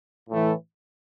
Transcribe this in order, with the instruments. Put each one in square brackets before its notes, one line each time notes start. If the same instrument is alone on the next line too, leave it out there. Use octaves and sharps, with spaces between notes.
[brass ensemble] A2 E3 A3 E4